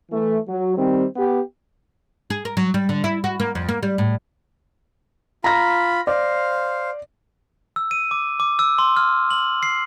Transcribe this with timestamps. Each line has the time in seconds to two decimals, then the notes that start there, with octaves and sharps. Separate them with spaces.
0.11 E3 A3
0.48 F#3
0.77 D#3 G3 C4
1.17 B3 G4
2.30 G#4
2.45 A#4
2.57 F#3
2.74 G3
2.89 D3
3.04 E4
3.24 F#4
3.40 A#3
3.55 F2
3.69 A#3
3.83 G3
3.98 A2
5.44 F4 A#5 B5 A#6
6.07 C5 D5 F5
7.76 E6
7.91 D#7
8.11 D6
8.40 D6
8.59 E6
8.79 C6
8.97 F6
9.31 F#7
9.63 C7